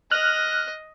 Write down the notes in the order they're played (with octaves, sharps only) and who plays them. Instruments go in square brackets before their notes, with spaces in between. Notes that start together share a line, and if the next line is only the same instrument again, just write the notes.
[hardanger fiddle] D#5 [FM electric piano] F6 F#6